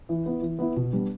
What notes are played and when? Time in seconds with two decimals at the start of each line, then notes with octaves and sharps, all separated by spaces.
0.09 E3
0.26 B3 E4
0.42 E3
0.59 B3 E4
0.76 B2
0.92 G3 B3 D4